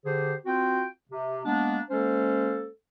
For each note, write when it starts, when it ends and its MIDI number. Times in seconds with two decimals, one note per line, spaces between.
0.05 0.34 50
0.05 0.34 67
0.05 0.34 68
0.05 0.34 72
0.46 0.85 60
0.46 0.85 65
0.46 0.85 66
0.46 0.85 79
1.10 1.39 48
1.45 1.79 56
1.45 1.79 58
1.45 1.79 59
1.45 1.79 62
1.90 2.68 56
1.90 2.68 58
1.90 2.68 61
1.90 2.68 69
1.90 2.68 72